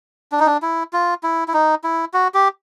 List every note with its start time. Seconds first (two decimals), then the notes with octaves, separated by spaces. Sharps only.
0.32 D4
0.40 D#4
0.47 D4
0.62 E4
0.93 F4
1.23 E4
1.48 E4
1.54 D#4
1.84 E4
2.14 F#4
2.34 G4